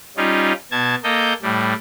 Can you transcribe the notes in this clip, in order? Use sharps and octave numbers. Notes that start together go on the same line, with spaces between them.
G3 C#4 D#4 F4
B2 A5 G#6
A#3 A4 D#5 G6
A2 G3